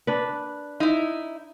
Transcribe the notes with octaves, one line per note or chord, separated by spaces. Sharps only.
D4 B4
D#4 E4